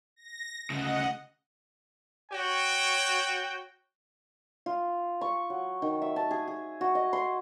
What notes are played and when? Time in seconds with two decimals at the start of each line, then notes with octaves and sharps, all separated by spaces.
0.16 A#6
0.70 D2 C#3 D#5 F#5
2.32 F#4 C#5 G5
4.66 F4
5.21 C#6
5.50 F#3
5.82 D#3
6.02 E5
6.16 A5
6.31 G#4
6.48 G#4
6.81 F#4
6.95 D#5
7.13 C6